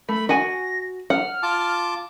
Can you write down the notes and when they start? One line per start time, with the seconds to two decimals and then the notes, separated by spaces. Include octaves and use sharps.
0.09 A3 B5
0.29 F#4 F#5 G#5 A#6
1.10 F#5 F6
1.43 F4 A5 D6